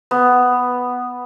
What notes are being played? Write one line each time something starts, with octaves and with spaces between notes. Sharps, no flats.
B3